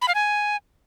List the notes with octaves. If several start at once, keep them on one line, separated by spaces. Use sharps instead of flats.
B5
F5
G#5